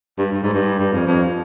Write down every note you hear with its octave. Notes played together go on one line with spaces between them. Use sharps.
G2
G2
G#2
G2
G2
F2
F2